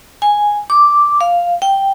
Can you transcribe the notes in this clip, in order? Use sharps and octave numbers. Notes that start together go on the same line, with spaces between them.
G#5
D6
F5
G5